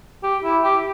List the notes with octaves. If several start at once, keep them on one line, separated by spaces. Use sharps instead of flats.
G4
E4
G4